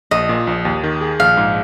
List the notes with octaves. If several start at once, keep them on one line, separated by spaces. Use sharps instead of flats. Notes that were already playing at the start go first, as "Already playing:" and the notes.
A#1 D#5
A#2
A#1
D#2
D#3
G#4
A#1 F5
G#2